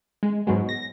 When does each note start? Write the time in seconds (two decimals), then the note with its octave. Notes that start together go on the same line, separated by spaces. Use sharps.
0.23 G#3
0.47 G#2 B2 F#3 G#3
0.69 A#6